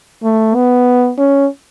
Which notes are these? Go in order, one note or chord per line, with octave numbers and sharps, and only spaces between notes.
A3
B3
C#4